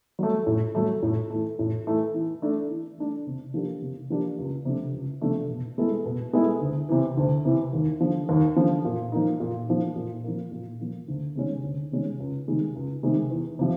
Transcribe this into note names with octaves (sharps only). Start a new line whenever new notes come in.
F#3 A3
A2
F#3 A3
A2
E3 A3
A2
E3 A3
E3
A3 D4
E3
A3 D4
C3
F3 A#3 D4 G4
C3
F3 A#3 D4 G4
C#2
C3 F3 A3 D4
C#2
C3 F3 A3 D4
B2
G#3 B3 E4 A4
B2
G#3 B3 E4 A4
D2
C3 E3
D2
C3 E3
D#2
D3 F3
D#2
D3 F3
A#2
F3 A#3 D#4
A#2
F3 A#3 D#4
A#2
F3 A#3
A#2
F3 A#3
D2
C3 D#3 G#3 C#4
D2
C3 D#3 G#3 C#4
C#2
C3 D#3 G#3
C#2
C3 D#3 G#3
E2
C3 F3